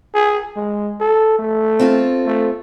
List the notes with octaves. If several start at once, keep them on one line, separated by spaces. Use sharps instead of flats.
G#4
G#3
A4
A3
C4 F4 A4
A3